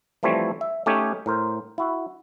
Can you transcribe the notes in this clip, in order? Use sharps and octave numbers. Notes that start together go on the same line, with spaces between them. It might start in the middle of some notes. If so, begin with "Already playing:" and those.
E3 F3 G3 A3 C4 C#5
E5
A3 C#4 D#4 G4 C#5
A2 A#4 C5
E4 F#4